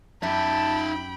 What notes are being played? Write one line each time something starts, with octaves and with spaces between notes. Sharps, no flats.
F#2 D#4 G4 E5 G5 A5 B5